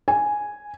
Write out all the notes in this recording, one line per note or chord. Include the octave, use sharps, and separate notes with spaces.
G#5